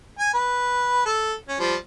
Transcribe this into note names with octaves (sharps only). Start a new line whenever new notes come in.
G#5
B4
A4
C#4
F3 G3